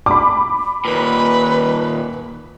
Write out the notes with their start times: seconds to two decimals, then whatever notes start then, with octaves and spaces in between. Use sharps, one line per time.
0.06 B5 D6
0.85 D#2 A#2 B4